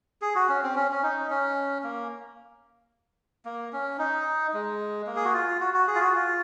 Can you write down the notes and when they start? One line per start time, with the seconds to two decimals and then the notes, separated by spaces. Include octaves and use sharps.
0.22 G#4
0.35 F#4
0.49 C#4
0.63 C4
0.76 C#4
0.91 C#4
1.03 D#4
1.30 C#4
1.84 A#3
3.45 A#3
3.73 C#4
3.99 D#4
4.53 G#3
5.07 A#3
5.16 G#4
5.25 F#4
5.33 F4
5.60 F#4
5.74 F#4
5.87 G#4
5.95 F4
6.01 F#4
6.15 F4